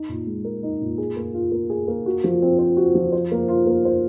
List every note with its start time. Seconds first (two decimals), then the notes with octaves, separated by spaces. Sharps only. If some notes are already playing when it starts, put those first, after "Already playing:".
Already playing: D#4
0.09 A#2
0.27 G#3
0.45 A#4
0.63 D#4
0.81 A#2
0.98 G#4
1.16 A#3
1.34 F4
1.52 A#3
1.70 G#4
1.88 A#3
2.06 F#4
2.24 F3
2.42 C4
2.59 C5
2.77 F#4
2.95 F3
3.13 C5
3.32 A#3
3.48 F4
3.67 A#3
3.85 C5